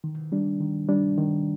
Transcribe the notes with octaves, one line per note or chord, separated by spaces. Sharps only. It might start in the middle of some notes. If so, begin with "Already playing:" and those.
D#3
G3 D4
D#3
G3 D4
D#3